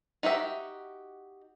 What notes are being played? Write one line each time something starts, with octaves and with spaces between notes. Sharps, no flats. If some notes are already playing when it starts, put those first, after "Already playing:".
D#4 F#4 G4 E5